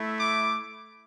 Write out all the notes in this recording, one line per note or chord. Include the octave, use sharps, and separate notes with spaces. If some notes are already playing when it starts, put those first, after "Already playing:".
Already playing: A3 E4
D6